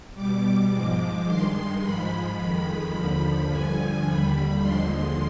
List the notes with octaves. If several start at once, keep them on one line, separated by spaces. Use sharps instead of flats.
B2 G3 D6
G#2 F3 G#3 D6
G2 D#3 G#3 C6
G#2 F3 G#3 B5
F2 D#3 G#3
D#2 D3 F3
G2 D3 F3 G#5
D#2 D3 G3 B5
D#2 D3 F3 G#3 C6